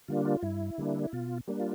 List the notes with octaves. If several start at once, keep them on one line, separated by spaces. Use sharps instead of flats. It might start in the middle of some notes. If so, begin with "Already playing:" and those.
D3 G3 A#3 D4 F4
F4
G2 E4
D3 G3 A#3 D4
E4
B2 F4
G3 A#3 D4
F4